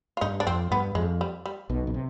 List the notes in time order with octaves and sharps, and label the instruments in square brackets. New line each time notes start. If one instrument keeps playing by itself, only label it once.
[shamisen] F4
[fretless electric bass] G2 [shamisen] D#4
[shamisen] D4
[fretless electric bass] F2 [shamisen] C4
[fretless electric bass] G2 [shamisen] B3
[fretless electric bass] F2 [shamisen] G#3
[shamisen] G3
G3
[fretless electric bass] B1 B2
B2
C3